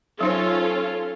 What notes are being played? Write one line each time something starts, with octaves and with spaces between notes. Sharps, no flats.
F#3 C#4 D#4 F4 A4 C5